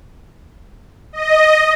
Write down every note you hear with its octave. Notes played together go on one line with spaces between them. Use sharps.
D#5